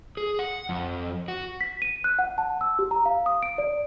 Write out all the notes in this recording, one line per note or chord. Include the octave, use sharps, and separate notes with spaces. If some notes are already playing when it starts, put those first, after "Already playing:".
G#4
F#5
F2
F#4
B6
D#7
F#6
F#5
A5
E6
G4
A#5
F5
D#6
D7
D5